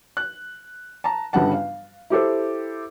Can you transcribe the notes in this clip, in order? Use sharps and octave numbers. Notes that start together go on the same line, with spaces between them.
F#6
A5 A#5
G1 G2 C#3 G3 F#5 A5
F5
E4 G4 A4 C5